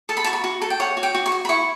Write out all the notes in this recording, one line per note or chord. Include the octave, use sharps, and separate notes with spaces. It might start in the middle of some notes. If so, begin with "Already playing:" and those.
A4 A5
B5
F#4 A5
B5
F#4
A4 A5
G5
C#5 F#5
F#4
G5
F#4
C#6
F#4
B5
E4 C#6